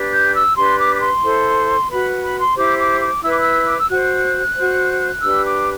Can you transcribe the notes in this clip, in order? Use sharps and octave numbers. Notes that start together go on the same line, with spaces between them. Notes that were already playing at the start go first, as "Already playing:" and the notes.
Already playing: D4 G4 B4
G6
E6
D4 G4 B4 C6
D6
D6
C6
E4 A4 C5
F#4 B4 B5
B5
C6
E4 G4 C5 D6
D6
D6
E4 B4 E6
D6
E6
D6
E6
F#4 C5 F#6
F#4 C5
D4 G4 B4 E6
D6